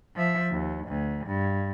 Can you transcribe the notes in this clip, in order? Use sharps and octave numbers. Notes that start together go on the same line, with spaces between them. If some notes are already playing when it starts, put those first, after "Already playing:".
F3 E5
D#2
D2
G2